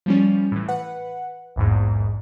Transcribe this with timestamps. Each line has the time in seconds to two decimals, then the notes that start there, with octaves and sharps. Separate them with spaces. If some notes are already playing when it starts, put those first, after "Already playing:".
0.06 F3 G3 C#4
0.52 A2 E3
0.68 B4 F#5
1.56 A#1 E2 G#2